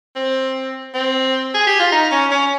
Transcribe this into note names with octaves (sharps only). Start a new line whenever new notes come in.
C4
C4
G#4
G4
F4
D#4
C#4
C#4